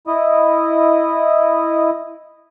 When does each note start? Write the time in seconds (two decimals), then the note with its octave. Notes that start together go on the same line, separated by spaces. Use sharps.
0.07 E4 D#5